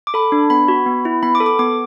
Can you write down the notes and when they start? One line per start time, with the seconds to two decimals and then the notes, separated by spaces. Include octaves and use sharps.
0.07 D6
0.14 A4 B5
0.32 D4
0.50 B3 B5
0.68 F#4
0.86 B3
1.05 E4
1.23 B3 B5
1.35 D6
1.40 A4
1.46 D6
1.59 B3 D6